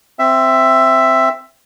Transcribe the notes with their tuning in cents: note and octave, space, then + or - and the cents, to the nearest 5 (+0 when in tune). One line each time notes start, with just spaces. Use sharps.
C4 +0 E5 +10